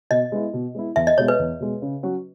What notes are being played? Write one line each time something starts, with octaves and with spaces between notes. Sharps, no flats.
B2 D#5
G#3 B3 E4
B2
G#3 B3 E4
E2 E5
D#5
B2 G#3 C#5
B4
E2
B2 G#3
C#3
F#3 C#4 F#4